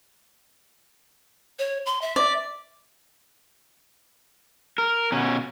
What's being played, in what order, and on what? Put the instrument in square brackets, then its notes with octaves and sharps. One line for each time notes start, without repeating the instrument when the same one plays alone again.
[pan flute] C#5
C6
E5
[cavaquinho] D5
[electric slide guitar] A#4
B2 C#4